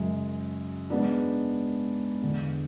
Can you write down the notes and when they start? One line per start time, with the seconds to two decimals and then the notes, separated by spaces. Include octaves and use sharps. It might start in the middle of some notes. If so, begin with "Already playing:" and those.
Already playing: F#2 C#3 G#3
0.90 G#2 G#3 B3 D4
2.21 E2 D3 G#3 B3